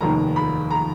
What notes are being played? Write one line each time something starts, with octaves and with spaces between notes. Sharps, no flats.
F1 D#2 D#3 A#5
B5
A#5